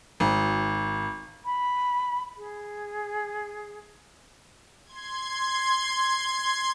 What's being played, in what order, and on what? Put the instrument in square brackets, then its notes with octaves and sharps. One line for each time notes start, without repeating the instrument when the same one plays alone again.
[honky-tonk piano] G#1
[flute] B5
G#4
[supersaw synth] C6 G#6